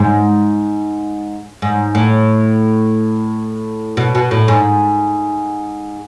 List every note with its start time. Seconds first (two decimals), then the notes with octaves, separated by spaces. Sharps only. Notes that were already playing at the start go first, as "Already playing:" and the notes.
Already playing: G#2
1.62 G#2
1.95 A2
3.97 B2
4.15 B2
4.31 A2
4.48 G#2